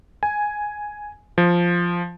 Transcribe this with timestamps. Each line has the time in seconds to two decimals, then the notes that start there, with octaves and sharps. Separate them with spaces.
0.23 G#5
1.38 F3